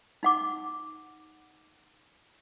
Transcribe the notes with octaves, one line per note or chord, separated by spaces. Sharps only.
D#4 F#5 D6